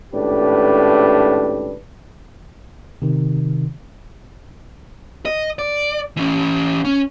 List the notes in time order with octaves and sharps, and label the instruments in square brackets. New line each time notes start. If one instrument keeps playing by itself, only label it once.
[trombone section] G#1 A2 C#4 D4 G4 B4
[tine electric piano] C3 D#3
[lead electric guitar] D#5
D5
E3 C#4
C#4